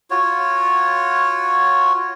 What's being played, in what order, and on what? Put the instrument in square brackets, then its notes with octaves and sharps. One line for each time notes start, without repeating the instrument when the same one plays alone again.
[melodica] F4 F#4 C#5